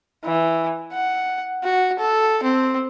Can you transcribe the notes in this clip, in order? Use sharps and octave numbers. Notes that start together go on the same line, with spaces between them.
E3
F#5
F#4
A4
C4